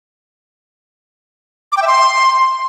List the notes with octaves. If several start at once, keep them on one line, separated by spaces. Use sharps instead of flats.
D6
G5
E5
C6